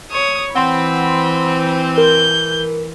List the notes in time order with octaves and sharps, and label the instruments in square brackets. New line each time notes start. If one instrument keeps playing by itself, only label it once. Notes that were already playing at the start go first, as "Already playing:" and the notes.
[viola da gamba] C#5 [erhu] D#6
[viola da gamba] E3 [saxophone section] C4 [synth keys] F#5 C6 [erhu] B5
[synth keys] A#4 [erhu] G6